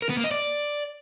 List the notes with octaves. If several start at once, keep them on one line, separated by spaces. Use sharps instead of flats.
A#4
B3
A#3
D#5
D5